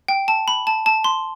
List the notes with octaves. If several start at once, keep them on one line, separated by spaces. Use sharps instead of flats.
G5
A5
B5
A5
A5
C6